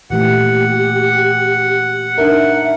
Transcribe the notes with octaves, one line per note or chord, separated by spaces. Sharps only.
A#2 E3 A3 G4 F#5
D4 D#4 A#4 E5